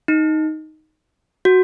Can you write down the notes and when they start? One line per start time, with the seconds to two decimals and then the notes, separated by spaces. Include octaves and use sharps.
0.08 D#4
1.45 F#4